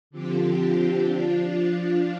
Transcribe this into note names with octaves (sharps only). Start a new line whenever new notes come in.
D3 F3 C4 G4
F3 D4 F4